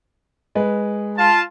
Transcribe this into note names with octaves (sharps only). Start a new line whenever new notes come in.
G#3 B4
F4 A5